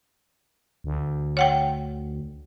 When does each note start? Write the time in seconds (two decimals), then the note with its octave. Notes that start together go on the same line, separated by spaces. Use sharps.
0.84 D2
1.37 C#5 F#5 G5